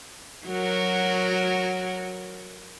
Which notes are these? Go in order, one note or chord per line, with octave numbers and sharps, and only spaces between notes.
F#3 F#4 A#4